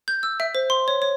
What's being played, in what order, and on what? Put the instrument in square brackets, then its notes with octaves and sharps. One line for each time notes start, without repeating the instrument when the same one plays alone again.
[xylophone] G6
E6
E5
C5
C6
C#5
C#5